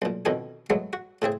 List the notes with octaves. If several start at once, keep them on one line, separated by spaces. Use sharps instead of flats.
B1 A#2
F2 B2 D3 D#3 C#4 E4
F#3 G#3 A3 B3
F#4
A2 C#3 C4 G#4